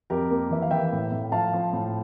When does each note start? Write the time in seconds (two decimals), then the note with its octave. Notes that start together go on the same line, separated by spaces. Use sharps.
0.10 F2 G4 A#4
0.31 A#3
0.50 E3 E5
0.62 F5
0.71 E3 E5 G5
0.92 A2
1.12 A2
1.32 F3 F5 A5
1.53 F3
1.73 A2